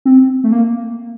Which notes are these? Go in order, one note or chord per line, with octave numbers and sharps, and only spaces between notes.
C4
A3
A#3